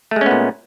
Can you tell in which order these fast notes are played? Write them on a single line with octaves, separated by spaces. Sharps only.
A3 G#3 C#4 B3 A#2